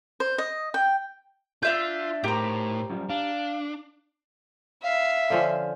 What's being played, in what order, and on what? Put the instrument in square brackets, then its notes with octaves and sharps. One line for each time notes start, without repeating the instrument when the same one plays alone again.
[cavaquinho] C5
D#5
G5
[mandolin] D4 E5 G6 [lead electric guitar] F4
[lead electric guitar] A2 [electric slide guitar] D#4 A#4 C5 [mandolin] G4 A#5
[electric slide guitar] F#2 F3 G3
[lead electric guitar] D4 [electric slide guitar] F5
[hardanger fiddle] E5 [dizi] F5
[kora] D3 F3 C#4